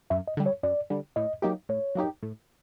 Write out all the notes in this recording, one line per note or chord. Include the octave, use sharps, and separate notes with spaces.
F#2 E5
D#5
D3 G3
C#5
F#2 D5
D3 G3
A2 D#5
F#3 A#3 D#4 G4
A2 C#5
F#3 A#3 D#4 G4
A2